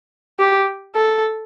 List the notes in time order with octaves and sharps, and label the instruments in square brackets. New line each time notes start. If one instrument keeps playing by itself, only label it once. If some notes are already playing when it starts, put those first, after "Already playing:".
[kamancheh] G4
A4